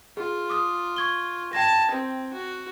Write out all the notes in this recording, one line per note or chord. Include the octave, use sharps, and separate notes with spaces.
F4 G#4
D6 D#6 F6
C#6 G#6 G7
G5 A5 G#6 A#6
C4
F#4